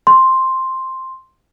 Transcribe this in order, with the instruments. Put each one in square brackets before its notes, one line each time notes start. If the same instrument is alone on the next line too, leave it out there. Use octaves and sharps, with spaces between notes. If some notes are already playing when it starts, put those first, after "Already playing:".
[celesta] C6